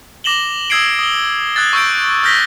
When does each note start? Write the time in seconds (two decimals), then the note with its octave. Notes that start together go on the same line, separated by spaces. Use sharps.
0.24 D6 A#6 E7 F#7 G7
0.70 D#6 E6 G#6 C7 D7
0.99 D#6 G7
1.56 D#6 F#6 G#6 A6
1.73 C#6 E6 G6 D7
2.23 D#6 F6 G6 A#6 B6 G7